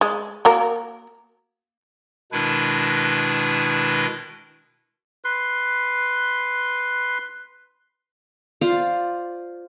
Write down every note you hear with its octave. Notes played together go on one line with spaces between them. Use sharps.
G#3
A#3 F#4 A#4
B2 D#3 G#3 D4 E4 B4
B4 C6
F4 C5 D5 F5